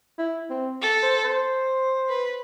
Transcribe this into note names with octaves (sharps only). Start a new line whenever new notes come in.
E4
C4
A4
C5
C5
B4